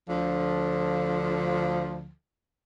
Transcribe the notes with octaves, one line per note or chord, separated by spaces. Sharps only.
D2 D3 F3